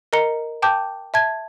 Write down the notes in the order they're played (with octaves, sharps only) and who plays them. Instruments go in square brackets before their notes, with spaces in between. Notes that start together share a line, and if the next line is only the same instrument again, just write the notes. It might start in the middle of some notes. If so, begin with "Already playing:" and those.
[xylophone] A#4 D#5 A#5 C#7 G7
G5 A5 D6 G6
E5 A5 G#6